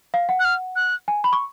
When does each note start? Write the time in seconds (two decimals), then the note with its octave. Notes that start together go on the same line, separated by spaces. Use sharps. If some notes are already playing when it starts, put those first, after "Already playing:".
0.14 F5
0.29 F#5
0.40 F#6
0.45 F6
0.76 F#6
1.08 G#5
1.24 B5
1.33 C#6